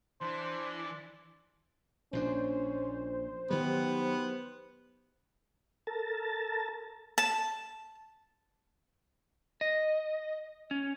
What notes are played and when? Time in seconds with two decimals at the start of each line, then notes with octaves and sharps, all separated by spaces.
0.21 E3 D4 C5 D5
2.13 A#1 A#2 C#4 D4 C5
3.51 D#3 F#3 B3 G4
5.87 A4 A#4 A5
7.18 A5
9.61 D#5
10.71 C#4